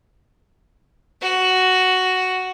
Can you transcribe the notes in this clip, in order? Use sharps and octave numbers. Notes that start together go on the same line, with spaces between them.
F#4